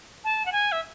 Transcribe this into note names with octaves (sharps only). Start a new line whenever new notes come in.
A5
F#5
G#5
E5